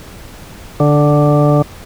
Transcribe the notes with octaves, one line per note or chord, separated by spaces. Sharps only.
D3